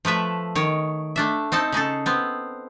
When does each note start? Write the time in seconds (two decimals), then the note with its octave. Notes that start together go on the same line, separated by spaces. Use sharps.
0.05 F3 A3 B4 E5
0.55 D#3 C#5
1.16 A3 D4 E5
1.52 C4 D#4 A4 A5
1.72 C#3 D#4 G#4 A4
2.06 B3 C4